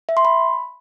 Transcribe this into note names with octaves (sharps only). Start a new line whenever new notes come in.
E5
C6
B5